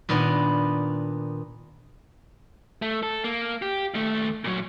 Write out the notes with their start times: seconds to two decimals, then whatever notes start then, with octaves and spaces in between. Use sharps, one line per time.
0.09 A#2 D#3 B3 D4 D#4
2.82 A3
3.03 A4
3.24 A#3
3.62 G4
3.94 D#2 A3
4.44 A#2 F#3